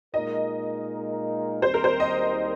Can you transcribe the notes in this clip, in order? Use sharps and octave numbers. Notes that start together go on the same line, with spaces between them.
A#2 G#3 D#4 A#4 D#5
D#2 D#3 G3 C4 C5
A#4
C5
D#5